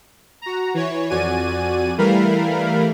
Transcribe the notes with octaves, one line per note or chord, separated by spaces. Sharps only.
F#4 A#5
E3 C#5
F2 F#4 D5 G#5 D#7
E3 G3 A3 A#4 F5 B5